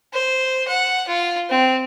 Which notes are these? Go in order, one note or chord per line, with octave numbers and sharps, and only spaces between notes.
C5
F#5
F4
C4